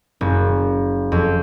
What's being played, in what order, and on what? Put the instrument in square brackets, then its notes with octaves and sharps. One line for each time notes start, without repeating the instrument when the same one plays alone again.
[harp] F#1
F2